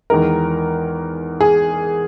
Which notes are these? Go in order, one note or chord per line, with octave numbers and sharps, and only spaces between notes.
E2 D#3 G#3 A#4
G#4